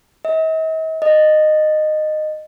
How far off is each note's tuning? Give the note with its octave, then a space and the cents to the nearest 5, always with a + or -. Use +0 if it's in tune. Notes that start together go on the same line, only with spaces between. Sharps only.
D#5 +45
D#5 -15